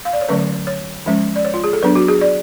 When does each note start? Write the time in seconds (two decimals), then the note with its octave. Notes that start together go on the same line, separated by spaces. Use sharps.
0.05 F5
0.13 D5
0.21 C#5
0.28 D3 F#3 A3 C#4 B4
0.67 C#5
1.06 F3 G#3 C#4
1.36 D5
1.45 C#5
1.54 F4
1.64 G#4
1.73 A4
1.82 F#3 B3 D4 B4
1.96 F#4
2.08 G#4
2.21 D5